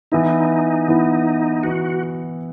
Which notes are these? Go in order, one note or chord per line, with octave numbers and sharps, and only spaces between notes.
E3 B3 D#4 E4
E3 B3 E4
E3 B3 F#4